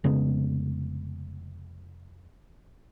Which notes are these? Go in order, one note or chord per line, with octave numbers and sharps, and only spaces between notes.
F1 C#3 G#3 B3